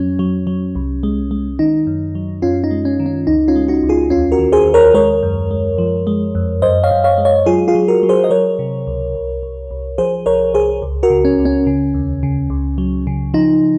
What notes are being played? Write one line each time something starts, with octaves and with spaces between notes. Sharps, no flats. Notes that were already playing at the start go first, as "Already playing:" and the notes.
Already playing: F2 F#3 C#4
F#3
F#3
C2
G#3
G#3
D#3 D#4
F#2
F#3
F#2 C#4 F4
D#4
G#3
C#4
D#3
C#4
C#2 D#4
C#4 F4
G#3
D#4 F#4
C#2
F4 G#4
D#2 C#4 F4
F#4 A#4
D#3
G#4 C5
D#2
A#4 C#5
G#3 A#4 C#5
F#2
G#3
F3
G#3
F2
F#2 C5 D#5
C#5 F5
F#2
C#5 F5
G#3
C#5 F5
F#3 F4 G#4
F4 G#4
F#3
F#4 A#4
F#3
G#4 C5
D#5
F#3 A#4 C#5
C3
C#2
C2
C2
C2
F3 G#4 C5
C2 A#4 C#5
C2 G#4 C5
C#2
F#4 A#4
C#3
C#4
C#2
C#4
C#3
D#2
C#3
C#2
F#3
C#3
F3 D#4